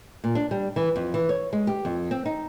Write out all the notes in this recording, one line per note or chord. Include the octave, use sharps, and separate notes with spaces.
A#2
D4
G3
E3
F2
E3
C#5
G#3
G4
F2
C4
D#4